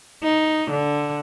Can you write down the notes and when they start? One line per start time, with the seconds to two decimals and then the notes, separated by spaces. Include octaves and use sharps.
0.23 D#4
0.70 D3